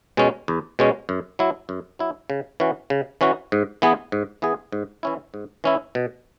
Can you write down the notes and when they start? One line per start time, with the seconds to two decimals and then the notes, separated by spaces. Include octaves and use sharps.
0.17 B2 G#3 C#4
0.48 E2
0.79 B2 G#3 C#4
1.09 F#2
1.39 F#3 E4
1.69 F#2
1.99 F#3 E4
2.30 C#3
2.60 E3 C#4 F#4
2.90 C#3
3.21 E3 C#4 F#4
3.52 G#2
3.82 E3 B3 G#4
4.12 G#2
4.42 E3 B3 G#4
4.72 G#2
5.03 E3 C#4 E4
5.34 G#2
5.64 E3 C#4 E4
5.95 B2